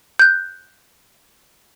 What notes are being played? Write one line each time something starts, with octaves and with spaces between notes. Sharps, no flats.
F#6 G6